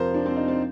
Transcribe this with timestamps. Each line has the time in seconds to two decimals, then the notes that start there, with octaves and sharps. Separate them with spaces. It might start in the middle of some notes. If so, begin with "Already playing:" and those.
Already playing: F2 C3 F3 A#4 C5
0.14 D4
0.26 C4
0.36 D#4
0.48 C4